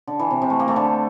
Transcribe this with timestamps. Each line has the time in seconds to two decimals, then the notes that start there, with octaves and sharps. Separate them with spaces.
0.07 D3
0.19 E3
0.31 C3
0.42 C3
0.50 A3
0.60 A#3
0.68 A3
0.76 D3